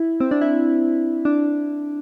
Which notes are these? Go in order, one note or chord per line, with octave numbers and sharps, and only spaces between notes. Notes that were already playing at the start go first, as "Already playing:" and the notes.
Already playing: E4
C4
D4
E4
D4